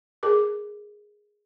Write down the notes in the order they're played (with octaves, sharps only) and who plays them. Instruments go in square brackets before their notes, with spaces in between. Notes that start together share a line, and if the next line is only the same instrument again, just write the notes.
[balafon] G#4 A#4 D6